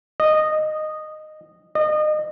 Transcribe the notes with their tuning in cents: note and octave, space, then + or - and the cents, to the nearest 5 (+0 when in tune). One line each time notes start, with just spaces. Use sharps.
D#5 -10
D#5 -30